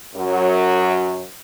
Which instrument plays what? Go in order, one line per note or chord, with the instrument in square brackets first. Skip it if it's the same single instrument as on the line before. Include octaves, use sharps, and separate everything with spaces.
[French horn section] F#2 F#3